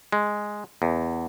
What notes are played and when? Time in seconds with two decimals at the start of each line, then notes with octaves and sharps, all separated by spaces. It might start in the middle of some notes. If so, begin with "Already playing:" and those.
0.12 G#3
0.82 E2